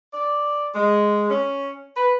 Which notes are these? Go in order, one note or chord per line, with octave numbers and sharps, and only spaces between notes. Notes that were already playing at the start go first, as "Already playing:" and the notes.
D5
G#3
C#4
B4